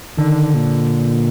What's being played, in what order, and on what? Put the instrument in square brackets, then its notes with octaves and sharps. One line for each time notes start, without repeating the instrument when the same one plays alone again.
[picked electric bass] D3 [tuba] D#3
[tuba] A#2